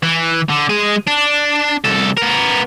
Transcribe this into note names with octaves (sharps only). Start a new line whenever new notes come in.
E3
D3
G#3 G#4
D4
C2 A4
B3 A#4